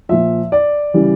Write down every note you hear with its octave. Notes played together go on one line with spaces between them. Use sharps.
A#2 F3 E5
D5
C#3 E3 G3